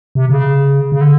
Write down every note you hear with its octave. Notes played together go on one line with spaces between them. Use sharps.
C3
C#3
C#3
D3